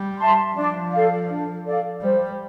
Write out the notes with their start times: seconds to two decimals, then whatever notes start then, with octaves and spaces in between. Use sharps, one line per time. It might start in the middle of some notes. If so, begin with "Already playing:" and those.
Already playing: G3
0.18 E5 A5 C6
0.55 F3 D4
0.91 A4 D5 F5
1.29 D4
1.65 A4 D5 F5
2.02 G3 C5